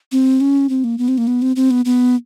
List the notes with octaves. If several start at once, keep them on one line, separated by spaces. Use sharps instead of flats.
C4
C#4
C4
A#3
B3
C4
A#3
B3
C4
C4
B3
B3